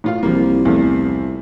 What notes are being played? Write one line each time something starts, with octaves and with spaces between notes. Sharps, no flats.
A2 F4 F5
C2 F3 G3 A#3
E2 F3 A3